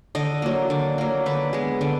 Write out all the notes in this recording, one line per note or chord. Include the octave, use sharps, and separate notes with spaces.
D3 D#5
F#3 A#3
D3
F#3 A#3
D3 B4
G#3 B3
D3